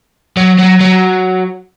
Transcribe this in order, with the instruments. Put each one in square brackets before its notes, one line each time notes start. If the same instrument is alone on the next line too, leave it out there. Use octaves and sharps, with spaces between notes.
[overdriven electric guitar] F#3
F#3
F#3